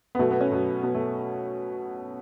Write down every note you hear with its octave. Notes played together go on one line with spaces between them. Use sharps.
B3
B2 F#3 A3
B3
C#4
B2 F#3
B2 F#3 B3
A3